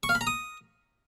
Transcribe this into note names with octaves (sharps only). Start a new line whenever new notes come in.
C#6
F5
B5
A#5
D#6